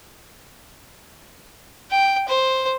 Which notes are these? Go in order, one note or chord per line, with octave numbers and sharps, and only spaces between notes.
G5
C5